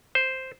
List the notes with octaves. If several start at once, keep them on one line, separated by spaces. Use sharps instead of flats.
C5